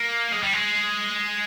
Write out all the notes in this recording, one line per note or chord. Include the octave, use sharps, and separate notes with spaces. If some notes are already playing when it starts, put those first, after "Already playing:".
Already playing: A#3
G#3
G3
G#3